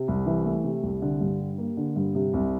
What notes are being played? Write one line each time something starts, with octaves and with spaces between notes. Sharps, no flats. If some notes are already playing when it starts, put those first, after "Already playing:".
Already playing: C3
C2
E3
A3
C3
C2
D3
G2
G3
A#3
D3
G2
C3
C2